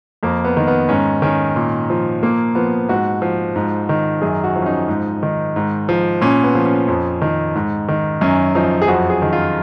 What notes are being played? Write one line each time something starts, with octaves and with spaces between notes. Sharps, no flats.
F2 A#3
B3
D#3
B3
G#2 C#4
D#3 C#4
A#2
F3
A#2 A#3
F3 B3
G#2 F#4
F3
G#2
D#3
F#2 G#4
F#4
F3
C#4
D#4
G#2
D#3
G#2
F3
A#2 C#4
B3
F3
C#4
F2
D#3
G#2
D#3
F#2 C#4
F3 D#4
G#4
F2 F#4
G#4
D#3
F4